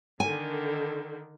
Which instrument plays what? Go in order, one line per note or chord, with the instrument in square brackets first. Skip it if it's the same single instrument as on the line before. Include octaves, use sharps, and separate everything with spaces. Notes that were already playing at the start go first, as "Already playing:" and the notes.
[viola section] D3 D#3 [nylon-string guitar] G#5